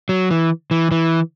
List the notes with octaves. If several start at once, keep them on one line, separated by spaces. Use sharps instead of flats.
F#3
E3
E3
E3